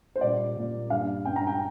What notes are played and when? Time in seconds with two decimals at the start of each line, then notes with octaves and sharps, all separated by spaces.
0.16 C5
0.21 A#2 G3 A#3 D5
0.56 A#2 G3 A#3
0.90 G2 D3 G3 F5
1.25 G2 D3 G3 G5
1.36 A#5
1.47 G5